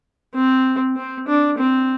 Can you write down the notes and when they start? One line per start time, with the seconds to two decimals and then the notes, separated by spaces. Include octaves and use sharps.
0.34 C4
0.96 C4
1.28 D4
1.58 C4